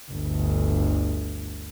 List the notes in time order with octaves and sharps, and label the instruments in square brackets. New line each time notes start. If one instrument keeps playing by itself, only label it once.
[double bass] G1 D2